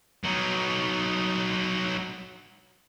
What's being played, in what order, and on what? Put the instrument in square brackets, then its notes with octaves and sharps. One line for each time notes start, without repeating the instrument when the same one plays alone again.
[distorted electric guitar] F#3 D#4